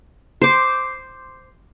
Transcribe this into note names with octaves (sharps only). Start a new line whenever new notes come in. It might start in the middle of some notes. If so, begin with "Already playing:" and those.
C5 D6